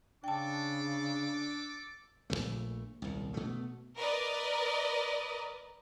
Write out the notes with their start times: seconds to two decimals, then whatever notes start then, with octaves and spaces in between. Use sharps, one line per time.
0.24 C#3 D4 A4 G5 A5 D6
2.30 A#1 F#2 A#2 A3
3.02 D#1 C2
3.34 B2 A3
3.97 A#4 B4 D5 D#5